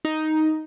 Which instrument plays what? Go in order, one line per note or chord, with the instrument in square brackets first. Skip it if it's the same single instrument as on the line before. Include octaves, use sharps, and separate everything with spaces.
[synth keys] D#4